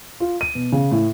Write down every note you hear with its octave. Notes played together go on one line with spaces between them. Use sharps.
F4
D#7
B2
C#3
A2